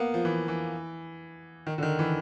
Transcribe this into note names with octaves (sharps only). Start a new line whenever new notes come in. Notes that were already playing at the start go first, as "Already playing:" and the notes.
Already playing: A#3 B3
F3
E3
E3
D#3
D3
D#3
E3